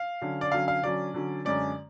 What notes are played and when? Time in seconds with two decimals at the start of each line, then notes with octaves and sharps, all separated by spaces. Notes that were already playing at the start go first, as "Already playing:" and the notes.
Already playing: F5
0.21 D3 F#3 C#4
0.41 D5
0.52 D3 F#3 C#4 F5
0.68 F5
0.83 D3 F#3 C#4 D5
1.14 D3 F#3 C#4
1.45 F#2 D3 G#3 C#4 D5